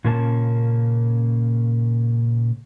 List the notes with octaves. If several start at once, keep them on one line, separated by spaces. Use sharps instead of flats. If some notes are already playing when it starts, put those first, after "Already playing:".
A#2 C#3 A#3 C#4 G#5 A5